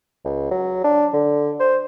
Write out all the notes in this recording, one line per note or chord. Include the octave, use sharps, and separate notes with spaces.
C#2
F#3
D4
D3
C5